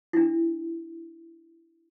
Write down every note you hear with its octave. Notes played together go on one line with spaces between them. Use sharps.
D4 E4